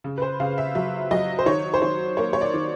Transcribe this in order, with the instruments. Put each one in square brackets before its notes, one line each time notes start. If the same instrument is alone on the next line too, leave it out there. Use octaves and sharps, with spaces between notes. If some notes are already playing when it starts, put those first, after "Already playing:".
[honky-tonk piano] C#3
B4
C5
C#3 F5
E5
F#3 E5
F#3 D#5
C5
D#3 C#5
C5
D#3 C#5
A#3 C#5
C#5
D5
D#3